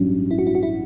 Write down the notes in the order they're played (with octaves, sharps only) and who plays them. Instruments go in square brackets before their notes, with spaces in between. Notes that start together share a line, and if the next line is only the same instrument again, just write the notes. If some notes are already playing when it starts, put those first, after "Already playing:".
Already playing: [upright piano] A1 G2 F#3
[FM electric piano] E4
F#4
E4
F#4
E4